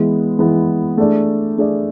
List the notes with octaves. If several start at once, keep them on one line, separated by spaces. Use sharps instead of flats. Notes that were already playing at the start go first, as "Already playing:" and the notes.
Already playing: E3 G#3 B3
E3 G#3 B3
A3 D4 G#4 D5
A3 D4 G#4 D5